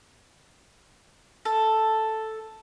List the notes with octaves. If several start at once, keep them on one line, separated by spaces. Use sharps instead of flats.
A4